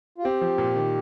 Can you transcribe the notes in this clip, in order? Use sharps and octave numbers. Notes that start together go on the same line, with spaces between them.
F4
C4 G4
F3
A#2
D#3